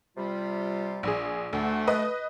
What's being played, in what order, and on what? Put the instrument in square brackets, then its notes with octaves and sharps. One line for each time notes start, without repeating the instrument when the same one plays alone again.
[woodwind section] C3 G3 F4
[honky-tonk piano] A#1 G#4
[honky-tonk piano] D2 [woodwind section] A3
[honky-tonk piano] B4 D#5